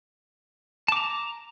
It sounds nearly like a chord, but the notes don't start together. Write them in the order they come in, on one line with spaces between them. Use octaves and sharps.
A5 D6 A#5